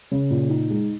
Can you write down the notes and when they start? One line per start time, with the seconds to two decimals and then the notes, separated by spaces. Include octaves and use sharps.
0.11 C#3
0.30 A#2
0.50 D#4
0.70 G#3